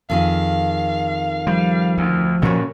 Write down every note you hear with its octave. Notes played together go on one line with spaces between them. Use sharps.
F2 D#3 G#4 F5
F3 G3
D2
G2 A#2 C#3 C#4 F#4 A#4